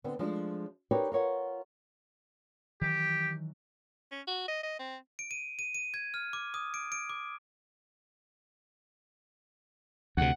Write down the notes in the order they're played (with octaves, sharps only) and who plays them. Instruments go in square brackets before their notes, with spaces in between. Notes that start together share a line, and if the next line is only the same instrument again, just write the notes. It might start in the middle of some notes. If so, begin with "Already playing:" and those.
[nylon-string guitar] D3 B3 C4 D4
F3 G#3 A3 D4
D#4 G4 A#4 B4 C#5 D5
F4 A#4 C#5 F#5
[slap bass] D#3 E3 F#3 [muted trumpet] G4
[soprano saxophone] C#4
F#4
D#5
D#5
C4
[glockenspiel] D7
D#7
D#7
D#7
G#6
F6
D6
D#6
D7
D7
D6
[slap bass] D2 C3 [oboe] F#5